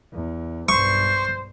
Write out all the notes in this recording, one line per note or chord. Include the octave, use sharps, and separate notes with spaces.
E2
B1 G2 C5 C#6